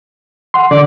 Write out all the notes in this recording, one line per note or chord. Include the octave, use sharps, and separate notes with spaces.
F#5 C6
D3 D5